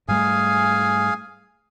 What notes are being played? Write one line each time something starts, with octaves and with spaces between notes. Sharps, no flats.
G#2 G3 A3 G#4 F5 G#5